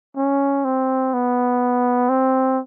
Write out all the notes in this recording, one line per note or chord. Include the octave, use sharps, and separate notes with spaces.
C#4
C4
B3
C4